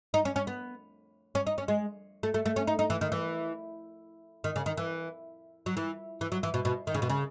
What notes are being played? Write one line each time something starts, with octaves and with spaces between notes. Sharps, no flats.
D#4
C#4
C#4
B3
C#4
D#4
C#4
G#3
A3
A3
A3
C#4
D#4
D#4
E3
D#3
E3
D#3
C#3
D#3
E3
F#3
E3
E3
F#3
E3
B2
B2
D#3
C#3
B2
C#3